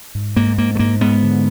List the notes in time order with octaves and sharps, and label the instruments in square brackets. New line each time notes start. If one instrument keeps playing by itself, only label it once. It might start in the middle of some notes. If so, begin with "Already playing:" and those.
[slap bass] G#2
G#2 A#3
G#2 A#3
A3
G#2 A#3
G#2 B3
D3